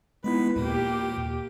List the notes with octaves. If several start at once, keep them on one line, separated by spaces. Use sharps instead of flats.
G#3 B3 D#4 E4 B4
D#2 A#2 A#3 G4